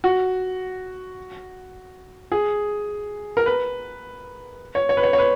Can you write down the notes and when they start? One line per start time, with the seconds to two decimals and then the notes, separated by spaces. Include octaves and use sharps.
0.04 F#4
2.32 G#4
3.37 A#4
3.46 B4
4.75 C#5
4.89 C#5
4.97 B4
5.03 C#5
5.13 C#5
5.19 B4